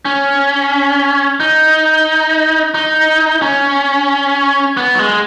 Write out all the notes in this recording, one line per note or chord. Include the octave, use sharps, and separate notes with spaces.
C#4
D#4
D#4
C#4
B3
F#3
G#3